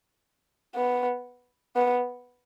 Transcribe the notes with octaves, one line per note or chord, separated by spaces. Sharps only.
B3
B3